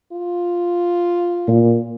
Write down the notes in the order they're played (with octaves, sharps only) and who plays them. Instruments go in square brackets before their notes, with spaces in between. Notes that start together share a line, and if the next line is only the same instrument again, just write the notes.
[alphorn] F4
[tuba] A#2